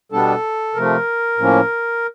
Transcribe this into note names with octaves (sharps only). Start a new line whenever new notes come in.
B2 G3 B3 D4 A4
C3 F3 A3 A#4
A2 F3 A#3 C#4